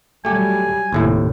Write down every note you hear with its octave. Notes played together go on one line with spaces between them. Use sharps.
F#3 G3 A3 G4 G#5
F1 D#2 A2 E4